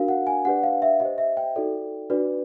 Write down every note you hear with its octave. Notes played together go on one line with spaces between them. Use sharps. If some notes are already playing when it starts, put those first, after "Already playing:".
Already playing: D4 F#4 A#4 F5
F#5
G#5
D4 G4 B4 D5 F#5
F5
E5
G4 C5 D#5
E5
G5
D#4 F#4 A4 D5
D4 F#4 B4 D5